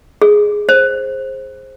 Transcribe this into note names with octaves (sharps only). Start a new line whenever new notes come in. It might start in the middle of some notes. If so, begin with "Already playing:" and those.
G#4
C5